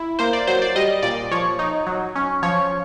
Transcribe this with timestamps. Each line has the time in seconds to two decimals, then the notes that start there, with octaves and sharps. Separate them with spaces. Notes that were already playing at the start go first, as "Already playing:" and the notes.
Already playing: E4
0.19 A#3 C5
0.33 D5
0.47 F#3 C5
0.62 D5
0.76 G3 D#5
1.03 A#2 D5
1.31 F3 C#5
1.59 D#4
1.87 F#3
2.16 C#4
2.42 F3 C#5